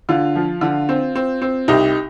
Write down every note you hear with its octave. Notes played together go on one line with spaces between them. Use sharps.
D3 F4
F3
D3
C4
C4
C4
C2 D#4 G4